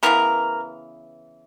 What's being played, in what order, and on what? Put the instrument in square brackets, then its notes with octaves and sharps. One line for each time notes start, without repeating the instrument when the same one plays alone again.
[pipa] C#3 E3 G#3 B3 A#4